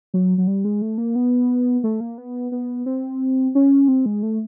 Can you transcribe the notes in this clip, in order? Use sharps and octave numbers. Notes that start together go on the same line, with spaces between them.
F#3
F#3
G3
G#3
A3
A#3
B3
A3
A#3
B3
B3
C4
C#4
C4
G#3
A3